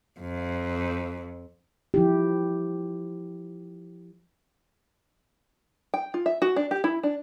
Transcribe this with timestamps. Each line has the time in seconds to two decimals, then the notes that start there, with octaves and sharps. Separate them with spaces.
0.20 F2
1.94 F3 E4 G4
5.94 G5
6.14 F4
6.26 E5
6.42 F#4
6.56 D4
6.71 G4
6.84 E4
7.03 D4